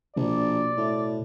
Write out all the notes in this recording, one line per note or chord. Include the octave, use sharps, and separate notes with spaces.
A#1 B2 D5
A2